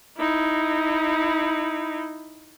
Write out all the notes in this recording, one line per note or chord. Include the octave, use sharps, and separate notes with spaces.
D#4 E4